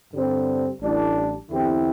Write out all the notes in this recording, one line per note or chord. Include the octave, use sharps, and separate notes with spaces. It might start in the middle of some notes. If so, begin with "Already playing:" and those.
G2 D3 G3 C4
A1 A2 G3 D4
E2 D3 C4 E4 G4